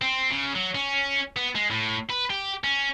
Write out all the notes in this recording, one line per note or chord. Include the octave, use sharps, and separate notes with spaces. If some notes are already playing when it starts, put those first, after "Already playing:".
C4
C#3
F#3
C#4
B3
G#3
A2
B4
G4
C#4